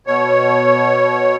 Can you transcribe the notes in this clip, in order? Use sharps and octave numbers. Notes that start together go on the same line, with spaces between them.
B2 C#5